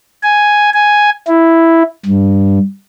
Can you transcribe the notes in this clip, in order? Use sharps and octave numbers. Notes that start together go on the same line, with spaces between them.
G#5
G#5
E4
G2